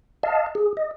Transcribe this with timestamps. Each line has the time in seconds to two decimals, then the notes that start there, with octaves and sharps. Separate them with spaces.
0.23 D#5 F5 A5
0.55 G#4
0.77 D#5